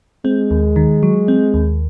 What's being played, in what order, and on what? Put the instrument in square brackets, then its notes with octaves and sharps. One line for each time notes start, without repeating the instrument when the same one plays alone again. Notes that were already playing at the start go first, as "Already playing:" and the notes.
[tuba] G#3 [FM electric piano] C4
[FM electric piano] D#2
D#3
F#3
C4
D#2